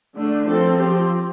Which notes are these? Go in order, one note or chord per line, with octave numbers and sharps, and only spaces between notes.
D3 A3 D4
F3 C4 A4
F3 C4 G4